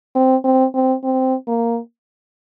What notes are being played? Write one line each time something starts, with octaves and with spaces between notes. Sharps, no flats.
C4
C4
C4
C4
A#3